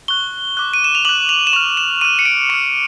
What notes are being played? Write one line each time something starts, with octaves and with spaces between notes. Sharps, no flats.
C#6 F#6 G7
D6 F#6
D#7
E7
F7
D6 F#6 F#7
F7
E7
C#6 F6 F7
E7
C#6 F6 D#7
C#7
D7
C#6 F6 C#7